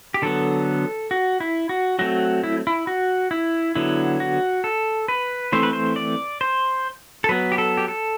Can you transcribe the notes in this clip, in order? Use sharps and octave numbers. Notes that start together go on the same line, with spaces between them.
G4
D3 F#3 B3 A4
F#4
E4
F#4
F#3 A3 C4 F#4
E4
E4
F#4
E4
D3 F#3 B3 E4
F#4
A4
B4
E3 A3 C4 C5
B4
C5
D5
C5
A4
F#3 B3 B4
G4
A4
G4
A4